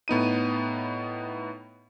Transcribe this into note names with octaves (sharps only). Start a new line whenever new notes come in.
A2 B3 D#4 D#7